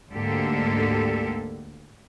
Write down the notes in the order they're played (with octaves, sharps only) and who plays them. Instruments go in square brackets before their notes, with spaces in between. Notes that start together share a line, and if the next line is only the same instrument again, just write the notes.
[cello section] D2 G#2 D3 A#3 G4 A4